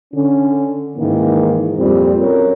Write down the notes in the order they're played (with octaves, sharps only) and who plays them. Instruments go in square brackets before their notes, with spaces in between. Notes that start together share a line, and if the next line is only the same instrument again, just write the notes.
[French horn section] D3 C#4
G#2 D#3 E3 A#3
F2 A#2 G3 C4
F#2 A#4 C#5